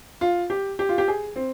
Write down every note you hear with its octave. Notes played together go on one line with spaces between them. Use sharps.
F4
G4
G4
F4
G4
G#4
C4